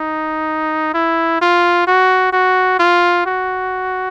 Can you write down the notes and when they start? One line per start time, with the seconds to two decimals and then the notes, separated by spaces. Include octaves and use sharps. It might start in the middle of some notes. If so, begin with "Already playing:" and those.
Already playing: D#4
0.94 E4
1.41 F4
1.87 F#4
2.33 F#4
2.80 F4
3.26 F#4